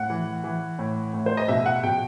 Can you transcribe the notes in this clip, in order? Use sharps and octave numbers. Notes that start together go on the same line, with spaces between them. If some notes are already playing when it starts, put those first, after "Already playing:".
Already playing: A2 F#5
E3
E3
A2
A2
C5
D#5
B2 E5
F#5
B2 G5